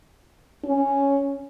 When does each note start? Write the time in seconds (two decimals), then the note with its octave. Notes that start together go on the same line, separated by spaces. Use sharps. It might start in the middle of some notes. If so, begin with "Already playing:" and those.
0.64 C#4